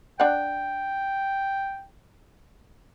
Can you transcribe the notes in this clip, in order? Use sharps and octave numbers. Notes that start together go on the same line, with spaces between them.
D4 F#5 G5